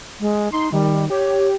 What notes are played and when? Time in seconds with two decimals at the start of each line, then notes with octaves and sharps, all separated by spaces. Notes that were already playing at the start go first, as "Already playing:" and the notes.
0.20 G#3
0.52 D#4 C6
0.72 D#3 G3
1.10 G4 C#5